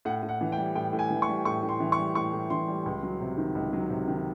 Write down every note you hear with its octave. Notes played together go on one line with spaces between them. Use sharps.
A2 F#5
A2
F#5
E3
G5
G3
A2 G5
A2
G#5
E3
C#6
G3
A2 C#6
A2
C6
E3
C#6
G3
A2 C#6
A2
E3 C6
G3
C#2
F#3
C3
D#3
C#2
F#3
C3
D#3